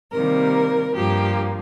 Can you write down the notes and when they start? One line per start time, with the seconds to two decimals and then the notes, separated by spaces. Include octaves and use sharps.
0.13 C3 D#3 G3 A#3 A#4
0.95 G2 F3 A#3 G4